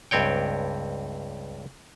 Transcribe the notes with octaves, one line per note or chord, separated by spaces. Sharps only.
C#2 G2 C4 C#5 G5